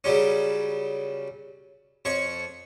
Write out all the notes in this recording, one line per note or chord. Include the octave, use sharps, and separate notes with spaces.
C#3 F#3 G3 C#4
F2 C#5 C#6